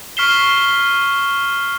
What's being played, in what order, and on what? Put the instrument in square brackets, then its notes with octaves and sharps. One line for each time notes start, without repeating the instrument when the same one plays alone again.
[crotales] C#6 F6 B6 C7 E7 G7